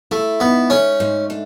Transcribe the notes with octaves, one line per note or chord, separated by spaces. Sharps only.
A3 E4
G#2 B3
A3 C#4
G#2
D4